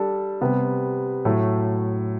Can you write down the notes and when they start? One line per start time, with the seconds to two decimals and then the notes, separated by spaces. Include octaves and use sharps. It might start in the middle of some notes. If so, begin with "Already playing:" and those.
Already playing: G3 D4 A4
0.41 C3 G3 B3
1.25 A2 F#3 A3